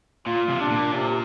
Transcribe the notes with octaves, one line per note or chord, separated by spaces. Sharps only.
A#2 F4
C3
D4
A#2
C3
C3